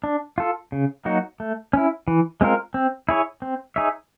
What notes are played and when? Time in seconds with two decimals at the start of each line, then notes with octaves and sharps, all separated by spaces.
0.04 D4
0.38 F4 A4
0.72 C#3
1.05 F#3 A#3 D#4 F#4
1.40 A3
1.73 C#4 E4
2.08 E3
2.41 G#3 C4 F4 A#4
2.74 C4
3.09 E4 G#4 C#5
3.42 C4
3.76 D#4 G#4 C#5 E5